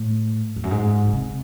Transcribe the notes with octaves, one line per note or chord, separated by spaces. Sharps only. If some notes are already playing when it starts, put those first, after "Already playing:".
Already playing: A2
E2
F#2
G#2
C#3
C3